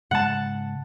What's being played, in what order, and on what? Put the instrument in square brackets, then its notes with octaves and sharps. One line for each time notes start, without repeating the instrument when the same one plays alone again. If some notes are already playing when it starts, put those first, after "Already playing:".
[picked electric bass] G#2 C#3 G#3 [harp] F#5 A5